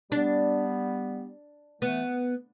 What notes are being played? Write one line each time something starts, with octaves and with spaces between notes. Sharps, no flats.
G3 B3 D4
E3 A3 B3